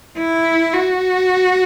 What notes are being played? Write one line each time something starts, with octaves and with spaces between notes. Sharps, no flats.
E4
F#4